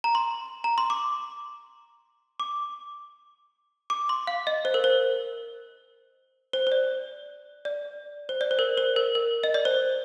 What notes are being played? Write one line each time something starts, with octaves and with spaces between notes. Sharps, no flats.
A#5
C6
A#5
C6
D6
D6
D6
C6
F5
D#5
C5
A#4
C5
C5
C5
D5
D5
C5
D5
C5
A#4
C5
A#4
A#4
D#5
D5
C5